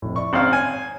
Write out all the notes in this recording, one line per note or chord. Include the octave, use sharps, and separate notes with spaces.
F1 A2
D5 E5 C#6
G#1 C#3 C4 F5 A#5 F#7
C#5 G#5